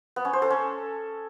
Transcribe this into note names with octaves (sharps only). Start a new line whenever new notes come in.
B3
C#4
C5
A4
C#4